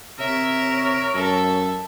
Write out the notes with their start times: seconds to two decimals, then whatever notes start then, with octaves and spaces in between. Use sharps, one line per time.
0.19 C3 A#4 C#5 E5
1.14 F#2 A4 E5